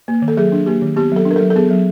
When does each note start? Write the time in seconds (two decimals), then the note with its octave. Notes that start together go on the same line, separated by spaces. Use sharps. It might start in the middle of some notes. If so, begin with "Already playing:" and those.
0.08 A#3
0.22 D#3
0.28 A4
0.37 F#3 G#4
0.52 D4
0.66 A#3 G4
0.81 D#3
0.96 B3 G4
1.12 F#3 A4
1.25 D4
1.31 A#4
1.36 F#3 A4
1.50 A4
1.56 B3 G#4
1.71 F#3